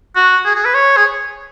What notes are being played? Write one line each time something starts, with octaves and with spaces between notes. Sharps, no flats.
F#4
G#4
G#4
B4
C#5
G#4